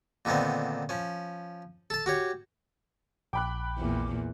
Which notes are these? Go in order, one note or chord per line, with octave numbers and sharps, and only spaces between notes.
A#2 D3 D#3 B3 C4
F3 C#4
A4 A5
F#4 G4 C#5
A#1 G5 B5 D6 F#6
E2 A#2